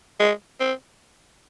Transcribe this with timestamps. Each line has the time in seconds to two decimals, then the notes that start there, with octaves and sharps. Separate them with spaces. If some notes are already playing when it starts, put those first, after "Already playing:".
0.20 G#3
0.60 C4